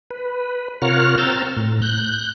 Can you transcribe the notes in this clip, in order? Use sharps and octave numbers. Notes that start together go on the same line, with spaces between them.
B4
C3 F4 A#4 C#5 F#5 F6
C4 A#5 E6 F6 G6 A6
A2
F#6 G6